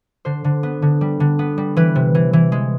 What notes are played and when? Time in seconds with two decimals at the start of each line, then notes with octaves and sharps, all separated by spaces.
0.25 D3 C5
0.44 D3
0.63 B3
0.82 D3
1.01 G3
1.20 D3
1.39 B3
1.58 G3
1.76 E3 B4
1.95 C3
2.15 E3
2.33 E3
2.52 G#3